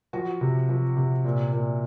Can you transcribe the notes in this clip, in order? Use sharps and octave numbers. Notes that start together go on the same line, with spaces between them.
F3 F#4
C3
F3
C3
A#2
A#2